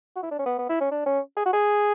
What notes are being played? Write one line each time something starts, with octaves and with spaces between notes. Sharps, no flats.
F#4
E4
D4
C#4
B3
B3
E4
C#4
D4
C#4
G#4
F#4
G#4